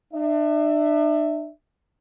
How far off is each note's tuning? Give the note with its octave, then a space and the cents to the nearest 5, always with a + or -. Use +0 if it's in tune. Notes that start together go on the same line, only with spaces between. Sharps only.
D4 +40 E5 +0